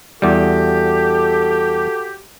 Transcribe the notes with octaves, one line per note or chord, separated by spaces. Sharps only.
E2 G3 F#4 G4 A4